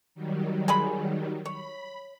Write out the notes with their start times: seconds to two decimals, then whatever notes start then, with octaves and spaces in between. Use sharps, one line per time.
0.15 D#3 F#3 G3
0.68 G#3 G#4 B5
1.45 C#5 B5